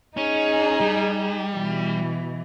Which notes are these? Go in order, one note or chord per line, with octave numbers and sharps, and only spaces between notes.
C#4 D#4 G#4
G3
B2 E3